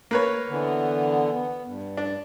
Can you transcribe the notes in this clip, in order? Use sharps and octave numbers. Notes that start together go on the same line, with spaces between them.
A#3 B4 C#5
D3 E3 B3
B3
G2
D4